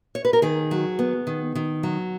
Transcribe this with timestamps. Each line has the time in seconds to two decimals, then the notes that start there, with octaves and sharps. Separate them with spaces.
0.15 C#5
0.25 B4
0.33 A#4
0.42 D#3 G#4
0.71 F#3
0.99 B3
1.27 D#3
1.55 D#3
1.83 F#3